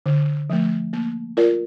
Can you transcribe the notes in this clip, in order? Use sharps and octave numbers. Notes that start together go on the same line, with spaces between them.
D3
F3 A3
A#3
F4 A#4 D5